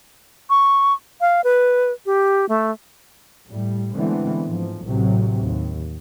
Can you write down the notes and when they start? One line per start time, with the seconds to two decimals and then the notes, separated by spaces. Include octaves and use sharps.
0.50 C#6
1.21 F5
1.44 B4
2.06 G4
2.49 A3
3.50 A2 G3
3.96 D3 E3 G#3 A3 B3 C4
4.46 G#2 F3
4.87 A1 A2 C3 F#3
5.40 D#2